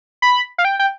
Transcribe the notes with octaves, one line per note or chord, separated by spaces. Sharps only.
B5
F5
G5
G5